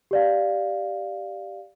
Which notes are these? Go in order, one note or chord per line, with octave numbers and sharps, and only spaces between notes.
G4 D5 F5